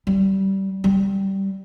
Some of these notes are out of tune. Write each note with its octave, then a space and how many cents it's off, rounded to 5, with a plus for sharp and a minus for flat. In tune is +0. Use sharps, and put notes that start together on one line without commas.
G3 -20
G3 -10